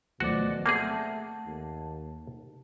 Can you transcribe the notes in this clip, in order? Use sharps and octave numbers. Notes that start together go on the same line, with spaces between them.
D2 B2 D#3 F3 F#3 A3 F#4 D5
A3 A#3 C4 G#4 F#5 A5
D#2